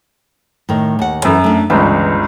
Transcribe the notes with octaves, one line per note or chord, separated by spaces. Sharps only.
A2 D#3
D#2 F#5
F#2 E3 A4
A3 D4
G1 C#2 E3